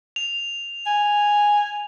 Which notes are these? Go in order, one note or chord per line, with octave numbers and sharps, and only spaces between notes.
F7
G#5